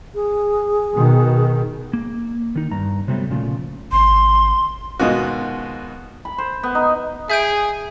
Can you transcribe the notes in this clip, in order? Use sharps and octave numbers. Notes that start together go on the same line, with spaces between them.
G#4
B2 D#3
A#3
D#3 D#4
G2 A#5
C3 F#3 G3 A3 B3
A#2 C#3 F3 A3
G#1 C6
G#2 B2 D#3 D#4 F4 F#4
B5
C5
B3
D#4
G#4 E5 G6 D7